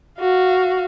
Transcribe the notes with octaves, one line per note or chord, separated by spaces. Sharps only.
F#4 F5